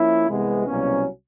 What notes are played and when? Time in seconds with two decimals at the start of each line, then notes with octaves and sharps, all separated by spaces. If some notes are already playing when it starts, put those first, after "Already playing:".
Already playing: F3 A#3 C#4 E4
0.28 C2 C3 E3 G#3 B3
0.66 C2 B2 F#3 A#3 C#4